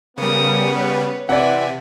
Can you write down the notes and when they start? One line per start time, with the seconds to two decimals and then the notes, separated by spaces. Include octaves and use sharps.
0.17 C#3 G3 B3 A#4 D#6
0.74 B4 C#5
1.29 C3 E3 D5 E5 F#5 G#5